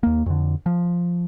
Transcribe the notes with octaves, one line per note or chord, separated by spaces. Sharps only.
D#2 A#3
F2 D3
F3